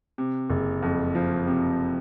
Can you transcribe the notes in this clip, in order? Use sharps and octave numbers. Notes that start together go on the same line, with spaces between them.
C3
F#1
F2
F3
C3